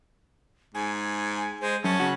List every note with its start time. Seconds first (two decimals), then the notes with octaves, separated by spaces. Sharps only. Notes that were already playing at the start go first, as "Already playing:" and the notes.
0.75 G#2 G#5
1.61 G#3 C5
1.84 F#2 C#4 A5
2.00 C#3 F#4